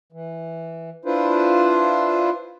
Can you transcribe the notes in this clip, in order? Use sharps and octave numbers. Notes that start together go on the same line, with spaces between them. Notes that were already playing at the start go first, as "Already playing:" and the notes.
E3
D4 E4 F4 B4 C5